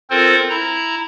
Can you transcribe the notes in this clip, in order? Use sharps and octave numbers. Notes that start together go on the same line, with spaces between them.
C4 F4 A4 A#4 C5
E4 A#5